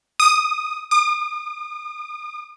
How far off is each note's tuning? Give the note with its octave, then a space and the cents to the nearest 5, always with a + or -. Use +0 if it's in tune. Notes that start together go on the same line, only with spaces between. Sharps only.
D#6 -5
D#6 -40